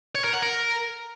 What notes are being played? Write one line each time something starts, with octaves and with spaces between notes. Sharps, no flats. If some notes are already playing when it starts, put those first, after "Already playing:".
C#5
A#4
F#5
A#4